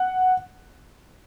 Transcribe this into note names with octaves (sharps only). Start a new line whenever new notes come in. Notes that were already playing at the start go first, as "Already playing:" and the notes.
Already playing: F#5